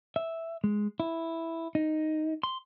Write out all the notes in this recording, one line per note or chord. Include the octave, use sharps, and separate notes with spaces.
E5
G#3
E4
D#4
C6